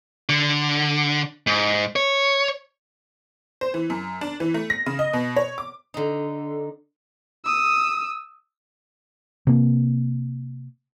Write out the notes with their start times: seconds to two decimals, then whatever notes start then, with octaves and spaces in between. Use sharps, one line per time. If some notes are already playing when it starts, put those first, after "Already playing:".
0.29 D3
1.47 G#2
1.96 C#5
3.61 C5
3.74 E3
3.90 F#2
4.21 D4
4.40 E3
4.54 A3
4.70 A#6
4.86 C#3
4.99 D#5
5.13 B2
5.36 C#5
5.58 D6
5.94 D3 D#4
7.45 D#6 E6
9.47 C3 A#3